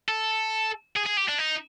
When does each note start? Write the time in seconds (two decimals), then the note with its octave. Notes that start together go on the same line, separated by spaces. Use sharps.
0.08 A4
0.96 G#4
1.06 G#4
1.17 G4
1.29 D4
1.39 D#4